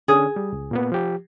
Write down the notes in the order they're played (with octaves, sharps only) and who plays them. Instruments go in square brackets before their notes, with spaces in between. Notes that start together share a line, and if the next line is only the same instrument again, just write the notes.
[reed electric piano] D3 C#4 D4 [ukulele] G#4
[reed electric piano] G3
C#2
A#2 A#3 B3
F3 G4